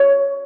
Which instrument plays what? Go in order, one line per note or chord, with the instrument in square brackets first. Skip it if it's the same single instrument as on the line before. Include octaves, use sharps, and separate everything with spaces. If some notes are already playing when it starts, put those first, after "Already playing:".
Already playing: [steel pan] C#5